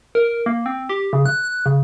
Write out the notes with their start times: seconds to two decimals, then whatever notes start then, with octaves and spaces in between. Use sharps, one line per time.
0.15 A#4
0.46 A#3
0.66 C4
0.89 G4
1.13 C#3
1.26 F#6
1.44 F#6
1.66 C#3